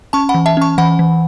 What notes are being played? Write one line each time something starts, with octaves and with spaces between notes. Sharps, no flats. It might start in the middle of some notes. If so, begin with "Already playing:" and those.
C#4 A5 C#6
F#5 B5
E3
E5 A5
C#4 A5 C#6
E3 F#5 B5
E3